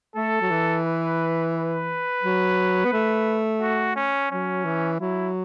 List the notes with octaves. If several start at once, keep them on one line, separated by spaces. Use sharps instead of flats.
A3 A4
F#3
E3
B4
B4
F#3
B3
A3
F#4
C#4
F#3 C#4
E3
F#3 E4